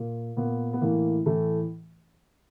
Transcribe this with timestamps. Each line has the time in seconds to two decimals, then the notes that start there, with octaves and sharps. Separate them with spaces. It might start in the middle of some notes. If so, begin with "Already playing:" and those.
Already playing: A#2
0.37 A#2 B3
0.73 B3
0.81 A2 E3 A#3
1.26 A2 E3 A3